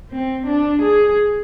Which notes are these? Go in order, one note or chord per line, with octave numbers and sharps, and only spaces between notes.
C4
D4
G#4